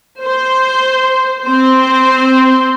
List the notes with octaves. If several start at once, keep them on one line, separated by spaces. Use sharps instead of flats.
C5
C4 C5